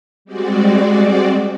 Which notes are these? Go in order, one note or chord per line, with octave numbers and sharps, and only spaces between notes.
G3 G#3 C4 F#4 D5